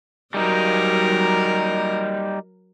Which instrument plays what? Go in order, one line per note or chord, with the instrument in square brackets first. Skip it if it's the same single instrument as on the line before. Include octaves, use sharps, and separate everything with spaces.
[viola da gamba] F#3 A#4 [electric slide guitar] G3 D#4